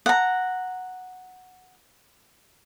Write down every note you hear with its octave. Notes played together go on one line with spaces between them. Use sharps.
F#5 A#5